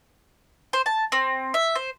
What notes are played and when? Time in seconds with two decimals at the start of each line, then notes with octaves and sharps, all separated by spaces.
0.73 C5
0.86 A5
1.12 C4
1.54 E5
1.75 C5